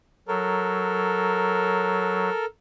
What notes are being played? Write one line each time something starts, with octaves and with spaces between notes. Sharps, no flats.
F#3 A4 A#4